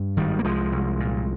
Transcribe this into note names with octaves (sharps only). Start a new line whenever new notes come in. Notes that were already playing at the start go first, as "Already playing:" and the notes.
Already playing: G2
G#1 D#3 G3
A#3
C2 F3 G#3
C2
A#2